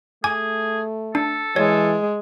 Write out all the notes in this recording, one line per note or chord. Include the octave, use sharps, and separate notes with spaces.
A3 G#4 G#5 D6 G#6
D4 A4
E3 G#3 C#5